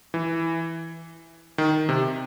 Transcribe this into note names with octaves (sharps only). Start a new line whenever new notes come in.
E3
D#3
C3